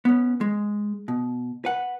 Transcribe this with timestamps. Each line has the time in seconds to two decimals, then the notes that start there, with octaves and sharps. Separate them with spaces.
0.05 B3 C#4
0.41 G#3
1.08 B2
1.65 B4 F#5